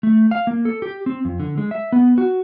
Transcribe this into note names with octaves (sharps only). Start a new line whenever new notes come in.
A3
F5
A#3
A4
G4
C4
F2
D3
G#3
E5
B3
F#4